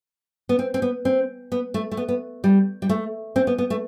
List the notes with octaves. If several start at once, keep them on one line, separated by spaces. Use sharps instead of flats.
B3
C4
C4
B3
C4
B3
A3
A3
B3
B3
G3
G3
A3
C4
B3
B3
A3